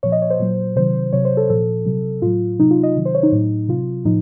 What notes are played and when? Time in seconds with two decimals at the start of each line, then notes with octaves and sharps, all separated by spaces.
0.03 A#2 F3 C#5
0.12 D#5
0.22 C#5
0.30 C5
0.39 A#2 F#3
0.76 C3 D#3 F#3 C5
1.13 C3 F#3 C#5
1.25 C5
1.37 A4
1.50 A#2 F3 A4
1.86 C3 F#3
2.22 A2 F#3 F4
2.59 C3 F#3 D#4
2.71 F4
2.83 D#5
2.96 C3 D#3 F#3
3.05 C5
3.15 C#5
3.23 D#4
3.32 A2 F#3
3.68 C3 F#3 F4
4.05 A2 F3 D#4